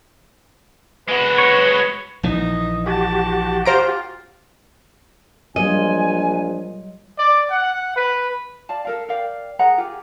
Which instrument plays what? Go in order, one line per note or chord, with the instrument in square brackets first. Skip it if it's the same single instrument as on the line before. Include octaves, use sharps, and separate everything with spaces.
[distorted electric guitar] G#3 F#4 [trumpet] B4
[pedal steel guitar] C#5
[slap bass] A#1 E3 [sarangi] D#4
[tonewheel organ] F#4 G4 [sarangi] A5
[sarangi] F4 [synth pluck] C5 A#5 D7
[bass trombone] A#1 [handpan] F#3 G3 F4 [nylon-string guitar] D#5 [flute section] G#5
[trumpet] D5
F#5
B4
[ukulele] D5 F5 A5
A4 A#4 F5
A#4 D5 F5 G5
G#4 A#4 F#5 A#5
F4 G4 G#4